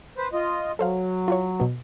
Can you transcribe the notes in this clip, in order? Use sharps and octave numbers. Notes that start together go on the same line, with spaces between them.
B4 C5
F4 D#5
F#3 A4 C5 F5
F4 F#4 C#5
B2 B3